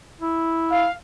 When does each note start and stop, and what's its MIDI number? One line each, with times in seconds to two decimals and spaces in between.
0.22 0.87 64
0.71 0.93 77